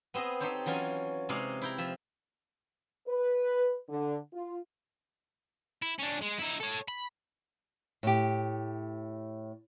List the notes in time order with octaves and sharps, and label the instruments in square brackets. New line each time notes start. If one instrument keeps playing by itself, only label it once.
[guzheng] B3 C4 G#4 D#5
C4 D#4 G4 A4 C5 C#5
E3 F#3 C#4 F4 G#5
C3 G#3 D#4 C#5 D5 F5
E4 G5 A#5
F3 E5
[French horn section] B4
D3
F4
[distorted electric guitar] E4
C#4 D4
G#3
D#4 E4
A4 C#5
B5
[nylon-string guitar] A2 G4